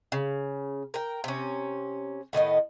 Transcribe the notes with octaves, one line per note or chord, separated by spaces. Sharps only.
C#3
A#4 G5
C3 C#4
A2 D#3 B3 D#5